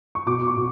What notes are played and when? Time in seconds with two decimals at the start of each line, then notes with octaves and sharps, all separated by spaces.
0.15 C#6
0.26 B2 D6
0.47 C#6
0.57 B2